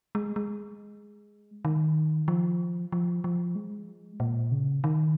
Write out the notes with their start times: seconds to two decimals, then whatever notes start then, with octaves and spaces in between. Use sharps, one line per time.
0.15 G#3
0.36 G#3
1.65 D#3
2.28 F3
2.92 F3
3.24 F3
3.55 G#3
4.20 A#2
4.51 C#3
4.84 D#3